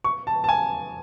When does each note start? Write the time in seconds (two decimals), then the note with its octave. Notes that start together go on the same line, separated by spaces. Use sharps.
0.04 C#6
0.27 A5
0.44 A5
0.49 G#5